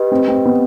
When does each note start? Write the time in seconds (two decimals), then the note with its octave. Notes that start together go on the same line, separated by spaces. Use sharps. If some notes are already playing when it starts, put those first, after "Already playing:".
Already playing: G4 B4 D#5
0.12 C4
0.28 C4
0.46 B3